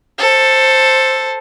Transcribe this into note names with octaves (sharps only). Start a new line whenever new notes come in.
A4 C5